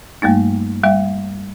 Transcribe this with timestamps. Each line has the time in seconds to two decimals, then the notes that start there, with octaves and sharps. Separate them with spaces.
0.22 G2 G3 A3 A#3 D#4
0.84 G3 E5 G5